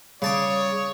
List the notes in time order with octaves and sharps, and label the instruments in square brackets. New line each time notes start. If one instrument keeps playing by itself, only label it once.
[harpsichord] C#3 A5 D6 [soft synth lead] G3 [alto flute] G#4 [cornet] C#5